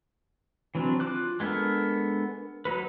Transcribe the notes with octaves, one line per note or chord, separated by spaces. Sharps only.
E3 F#3 C4 D4
F4 D6 F#6
G#3 B3 D4 A4 A#4
F#3 D#4 B4